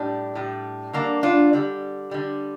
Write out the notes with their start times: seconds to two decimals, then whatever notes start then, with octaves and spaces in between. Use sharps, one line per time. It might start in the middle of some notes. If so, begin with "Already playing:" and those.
Already playing: A2 G3 D4
0.35 A2 G3
0.93 D3 G3 A#3 D4
1.23 D4 F4
1.53 D3 G3
2.11 D3 G3